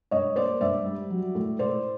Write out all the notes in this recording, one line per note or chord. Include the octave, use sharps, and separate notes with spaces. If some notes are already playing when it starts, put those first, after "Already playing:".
G2 C#5 D#5
A#3 C5 D5
G2 D5 E5
G3
F#3
A2
A2 C5 D5